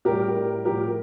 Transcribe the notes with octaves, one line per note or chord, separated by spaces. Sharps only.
A2 G3 G4 A#4
A2 F3 G4 A#4